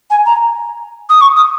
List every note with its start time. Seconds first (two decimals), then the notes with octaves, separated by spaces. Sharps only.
0.10 G#5
0.25 A#5
1.09 D#6
1.21 C#6
1.36 D#6